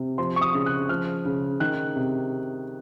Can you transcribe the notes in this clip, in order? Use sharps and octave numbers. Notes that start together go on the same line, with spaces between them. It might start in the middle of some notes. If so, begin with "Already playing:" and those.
Already playing: C3
F3 C6
C#6
D#6
C#3
F#6
F3 F6
C#3
D#3 F#6
C3